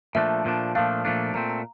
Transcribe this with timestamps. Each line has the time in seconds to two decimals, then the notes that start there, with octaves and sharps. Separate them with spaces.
0.15 A#2 F3 A3 D4 E5
0.45 A#2 F3 A3 D4
0.75 A#2 F3 A3 D4 F5
1.05 A#2 F3 A3 D4
1.34 A#2 A3 C4 A#5
1.50 A#5